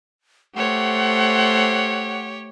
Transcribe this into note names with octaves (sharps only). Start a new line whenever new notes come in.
A3 G4 C5 C#5 F#5